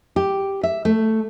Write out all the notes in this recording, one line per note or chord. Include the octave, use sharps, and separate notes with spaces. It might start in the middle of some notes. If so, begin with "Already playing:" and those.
G4
E5
A3